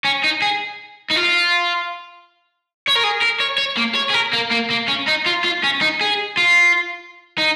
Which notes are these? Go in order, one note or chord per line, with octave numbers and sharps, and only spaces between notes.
C#4
D#4
G#4
D#4
F4
C#5
A#4
G#4
A#4
C#5
C#5
A#3
C#5
G#4
A#4
A#3
A#3
A#3
C#4
D#4
F4
F4
C#4
D#4
G#4
F4
D#4